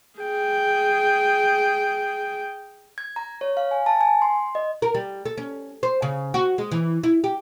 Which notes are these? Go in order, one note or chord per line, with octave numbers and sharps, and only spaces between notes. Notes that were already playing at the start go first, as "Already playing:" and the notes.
G#4 G5
G#6
A#5
C#5
F5
G#5
A5
G#5
C6
D#5
A#4
G3
A4
C#4
C5
C#3
F#4
G#3
E3
E4
G4